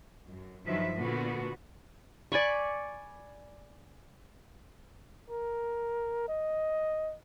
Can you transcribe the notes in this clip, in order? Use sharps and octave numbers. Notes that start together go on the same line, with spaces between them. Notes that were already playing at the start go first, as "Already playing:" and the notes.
F#2
G2 D#3 F3 F#3 B4 E5
A#2 D3 B3 F#4
D5 G#5 B5 C#6
A#4
D#5